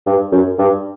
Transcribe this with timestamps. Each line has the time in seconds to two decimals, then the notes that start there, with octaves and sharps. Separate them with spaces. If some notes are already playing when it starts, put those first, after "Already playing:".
0.06 G2
0.32 F#2
0.58 G2